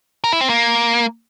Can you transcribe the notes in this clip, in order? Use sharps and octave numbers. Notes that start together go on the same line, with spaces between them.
A#4
E4
C4
A#3